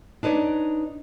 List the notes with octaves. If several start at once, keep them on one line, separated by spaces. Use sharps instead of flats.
D4 D#4 B4 C#5 D5